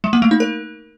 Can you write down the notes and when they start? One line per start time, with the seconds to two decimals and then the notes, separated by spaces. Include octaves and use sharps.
0.04 G#3
0.13 A#3
0.22 A3
0.31 D#4
0.40 A#4